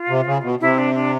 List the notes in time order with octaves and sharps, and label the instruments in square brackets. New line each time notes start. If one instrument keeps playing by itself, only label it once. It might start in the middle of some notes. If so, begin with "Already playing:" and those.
Already playing: [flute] F4
[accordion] C3
C#3
B2
[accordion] C3 [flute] E4
[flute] D4
D4